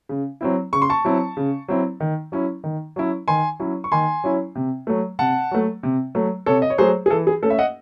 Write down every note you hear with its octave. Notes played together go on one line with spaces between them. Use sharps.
C#3
F#3 C4 E4
C#3 C#6
C6
A5 C#6
F#3 C4 E4
C#3
F#3 C4 E4
D#3
F#3 C#4 E4
D#3
F#3 C#4 E4
D#3 G#5 C6
F#3 C#4 E4
C#6
D#3 G#5 C6
F#3 C#4 E4
C3
F#3 A3
C3 F#5 A5
F#3 A3
C3
F#3 A3
C3 A4 C#5
D#5
C#5
F#3 A3 G#4 C5
G#4
E3 A4
G#4
A3 C#4 A4
E5
D#5 F#5